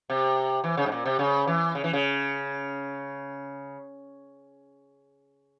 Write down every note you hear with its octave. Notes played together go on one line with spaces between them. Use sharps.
C3
E3
C#3
G#2
A#2
C3
C#3
E3
C#3
E3
C#3